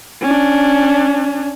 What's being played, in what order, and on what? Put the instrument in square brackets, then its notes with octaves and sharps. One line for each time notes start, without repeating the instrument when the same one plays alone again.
[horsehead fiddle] C#4 D4